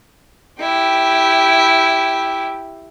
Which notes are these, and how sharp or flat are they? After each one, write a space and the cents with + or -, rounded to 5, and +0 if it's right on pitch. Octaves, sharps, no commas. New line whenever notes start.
E4 +0 G4 +0